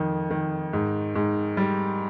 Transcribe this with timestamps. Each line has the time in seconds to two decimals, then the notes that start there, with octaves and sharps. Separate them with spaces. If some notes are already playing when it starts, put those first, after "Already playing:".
Already playing: F2 D#3
0.31 D#3
0.73 G#2
1.15 G#2
1.57 G3